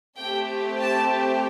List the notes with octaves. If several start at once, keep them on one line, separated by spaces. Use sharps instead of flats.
A3 C4 G4 G5
A5